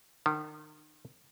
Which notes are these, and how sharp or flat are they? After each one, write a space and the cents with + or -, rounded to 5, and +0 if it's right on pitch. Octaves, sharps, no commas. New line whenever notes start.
D#3 -35